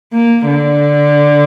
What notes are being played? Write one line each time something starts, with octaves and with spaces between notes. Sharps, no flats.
A#3
D3